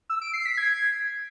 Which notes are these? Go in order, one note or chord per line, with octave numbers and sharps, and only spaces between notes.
E6
D7
C7
B6
G#6